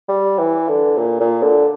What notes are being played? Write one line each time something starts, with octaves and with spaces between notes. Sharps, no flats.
G3
E3
D3
A#2
A#2
D3